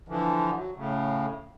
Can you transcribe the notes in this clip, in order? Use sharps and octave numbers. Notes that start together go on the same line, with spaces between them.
D3 E3 F3
F#3
A2 C#3